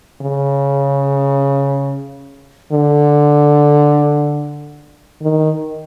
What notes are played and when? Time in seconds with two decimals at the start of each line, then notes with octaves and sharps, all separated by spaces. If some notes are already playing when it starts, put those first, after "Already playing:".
0.22 C#3
2.72 D3
5.21 D#3